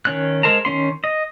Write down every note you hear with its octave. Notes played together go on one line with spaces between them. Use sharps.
D#3 C#4 F#6
G#3 A#4 C5 A5 A#5
D#3 A#3 C#4 C6
D#5